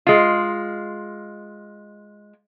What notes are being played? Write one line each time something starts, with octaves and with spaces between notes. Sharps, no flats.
G#3 F4